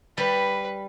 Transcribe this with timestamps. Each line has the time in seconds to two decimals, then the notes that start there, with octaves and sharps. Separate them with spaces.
0.18 G3 B4